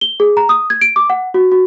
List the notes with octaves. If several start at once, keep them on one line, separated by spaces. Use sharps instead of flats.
G7
G#4
A#5
D#6
G#6
D7
D6
F#5
F#4
F#4